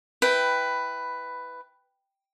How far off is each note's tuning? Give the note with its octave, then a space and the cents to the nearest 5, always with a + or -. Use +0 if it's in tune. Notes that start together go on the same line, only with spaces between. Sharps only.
E4 +0 B4 +10 G5 +0